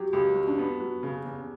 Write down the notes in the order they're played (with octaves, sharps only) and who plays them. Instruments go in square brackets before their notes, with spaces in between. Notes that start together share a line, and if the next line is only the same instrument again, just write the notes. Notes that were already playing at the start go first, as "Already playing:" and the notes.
Already playing: [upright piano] F#3 [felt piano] G4
[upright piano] C#2 [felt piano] G4
[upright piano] F#3
[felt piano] D4
[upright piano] B3
F#3
C#3
E2